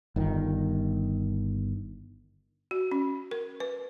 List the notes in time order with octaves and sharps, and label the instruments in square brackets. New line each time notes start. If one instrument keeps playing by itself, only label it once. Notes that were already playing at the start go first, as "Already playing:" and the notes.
[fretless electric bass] G1 D#3
[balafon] F#4
C#4
A#4
B4